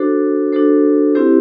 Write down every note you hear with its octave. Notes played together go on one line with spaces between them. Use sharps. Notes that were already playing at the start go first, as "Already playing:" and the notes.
Already playing: D4 F#4 A4 C5
D4 F#4 A4 C5
C4 E4 G4 C5